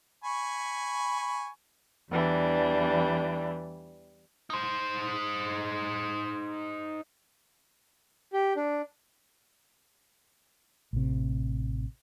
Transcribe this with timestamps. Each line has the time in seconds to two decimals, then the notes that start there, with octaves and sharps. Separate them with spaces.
0.24 G#5 B5 C#6
2.09 E2 E3 G3 D4
4.50 D#4 C5
8.33 G4
8.56 D4
10.93 A1 C3